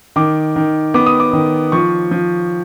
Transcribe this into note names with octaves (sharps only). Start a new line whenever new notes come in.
D#3 D6
D#3
B3 D6
D#6
D6
D#3
F3 C#6
F3